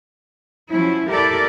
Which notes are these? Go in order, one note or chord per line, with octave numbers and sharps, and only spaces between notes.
F3 F#3 C#4 E4
E4 G4 A4 A#4 D5